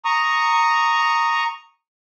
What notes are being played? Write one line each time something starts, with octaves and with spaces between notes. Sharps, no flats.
A#5 C#6 D#6